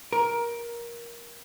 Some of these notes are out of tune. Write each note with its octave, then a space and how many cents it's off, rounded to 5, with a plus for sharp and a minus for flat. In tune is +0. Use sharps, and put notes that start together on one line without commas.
A#4 +15